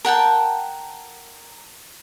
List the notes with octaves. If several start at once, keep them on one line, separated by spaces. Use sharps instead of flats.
A#4 F#5 G5 A5